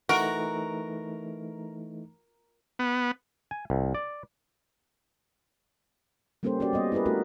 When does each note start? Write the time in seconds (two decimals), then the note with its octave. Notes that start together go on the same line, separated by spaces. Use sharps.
0.09 E3 A3 D#4 F#4 A#4
2.79 B3
3.51 G#5
3.70 C2
3.95 D5
6.43 G3 A#3 C#4 G4 A4 C5
6.60 C#4 F#4 G4 D5
6.73 G3 B3 D#5
6.92 E4 G4 G#4 A#4 B4
7.06 A3 D4 F4 F#4 A#4